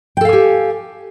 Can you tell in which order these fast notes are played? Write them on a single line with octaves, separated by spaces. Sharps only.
G5 A4 F5 G#5 G4